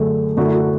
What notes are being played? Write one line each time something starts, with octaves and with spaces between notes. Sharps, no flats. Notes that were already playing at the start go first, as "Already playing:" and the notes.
Already playing: F#2 D3 A3 G#4
F#2 D3 F#3 A3 F#4
E4
F#4